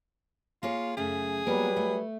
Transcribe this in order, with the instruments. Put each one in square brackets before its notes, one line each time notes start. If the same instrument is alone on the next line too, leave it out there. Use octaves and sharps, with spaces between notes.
[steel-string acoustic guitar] A#3 G#4 C#5 [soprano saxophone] F4
[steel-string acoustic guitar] F#2 C#3 A3 [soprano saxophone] G#4
[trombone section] F#3 G3 B4 [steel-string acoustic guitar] A#3 B3 A#4
[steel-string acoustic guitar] A3